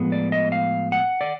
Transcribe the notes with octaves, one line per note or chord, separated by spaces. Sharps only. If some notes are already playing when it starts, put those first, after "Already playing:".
Already playing: A2 F3 G#3 B3
D5
D#5
F5
F#5
D5